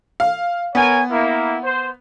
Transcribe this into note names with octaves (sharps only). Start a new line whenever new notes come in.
F5
B3 A#4 C#5 G#5
A#3 E4
C5